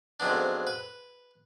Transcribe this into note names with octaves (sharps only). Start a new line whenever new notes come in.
F2 G#2 F#3 B3 D4
B4